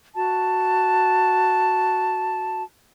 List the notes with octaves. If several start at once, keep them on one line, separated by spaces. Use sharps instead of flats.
F#4 A5